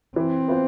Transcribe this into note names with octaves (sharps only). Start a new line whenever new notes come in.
E3 C4
B3 F4 C5